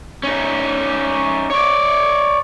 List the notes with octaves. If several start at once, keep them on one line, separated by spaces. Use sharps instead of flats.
C#4 D#4
C#5 D5